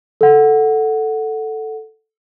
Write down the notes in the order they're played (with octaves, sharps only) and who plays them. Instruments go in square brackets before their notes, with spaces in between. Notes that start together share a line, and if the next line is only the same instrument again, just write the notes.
[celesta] A4 F#5